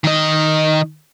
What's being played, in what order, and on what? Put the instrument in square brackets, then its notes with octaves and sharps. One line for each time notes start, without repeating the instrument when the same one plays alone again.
[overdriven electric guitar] D#3 D#5